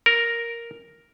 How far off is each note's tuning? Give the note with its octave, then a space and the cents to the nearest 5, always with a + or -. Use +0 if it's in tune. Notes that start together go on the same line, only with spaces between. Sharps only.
A#4 +0